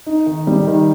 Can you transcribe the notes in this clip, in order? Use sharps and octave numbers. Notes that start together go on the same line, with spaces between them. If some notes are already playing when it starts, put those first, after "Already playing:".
D#4
D#3
G3
D#3